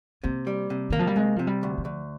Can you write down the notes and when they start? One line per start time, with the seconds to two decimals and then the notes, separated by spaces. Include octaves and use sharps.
0.24 C3 A#3
0.47 G3
0.70 C3
0.90 D#3 A#3
0.99 F3
1.07 G3
1.16 C3 G#3
1.36 C3 F3
1.47 G3
1.63 D2
1.78 F3
1.85 D2